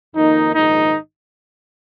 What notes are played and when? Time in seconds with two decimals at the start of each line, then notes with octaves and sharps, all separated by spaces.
0.15 F2 D#3 A#3 D#4
0.54 A#1 G#2 D#3 D#4